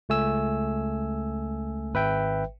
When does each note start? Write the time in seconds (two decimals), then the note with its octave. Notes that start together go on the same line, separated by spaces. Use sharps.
0.09 C#2 A3 G#5 E6
1.94 G#1 B4 E5 G5